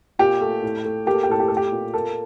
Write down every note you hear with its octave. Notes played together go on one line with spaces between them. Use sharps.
A#2 G4
A3
A2
A3
A#3 G4
A4
G4
A2 A4
G4
A3 A4
G4
A#2
A#3 A4